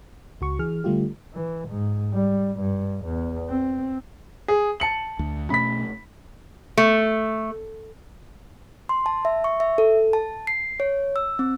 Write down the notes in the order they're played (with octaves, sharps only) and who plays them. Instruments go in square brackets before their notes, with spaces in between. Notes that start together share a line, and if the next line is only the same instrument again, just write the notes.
[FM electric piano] C#2 F#4 C#6
E3 G#4 F6
D3 G3 A3 F4 G4
[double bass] E3
G#2
G3
G2
E2
C4
[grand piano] G#4
A5 C#7 F#7
[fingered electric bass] D2
[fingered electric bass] B2 A3 C#4 [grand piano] B5 B6
[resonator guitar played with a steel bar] A3
[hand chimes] C6
A5
E5
C#6
E5
A4
A5
C7
C#5
E6
C4